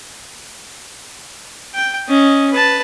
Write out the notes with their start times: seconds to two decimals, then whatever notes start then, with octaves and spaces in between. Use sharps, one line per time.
1.74 G5
2.08 C#4 D#5
2.52 B4 A5